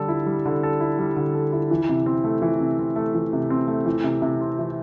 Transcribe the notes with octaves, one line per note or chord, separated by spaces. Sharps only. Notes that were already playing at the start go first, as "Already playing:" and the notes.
Already playing: D3 G3 A4
E4
G3
D3
A4
E4
G3
D3
A4
E4
E3
C3
C4
A3
E3
C3
C4
A3
E3
C3
C4
A3
E3
C3
C3
C4
E3